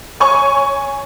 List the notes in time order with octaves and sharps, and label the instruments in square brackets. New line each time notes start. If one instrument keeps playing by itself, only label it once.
[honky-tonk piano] C#5 G#5 C#6